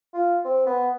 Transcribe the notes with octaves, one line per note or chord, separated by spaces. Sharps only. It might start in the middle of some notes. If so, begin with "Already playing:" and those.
F4
C4
B3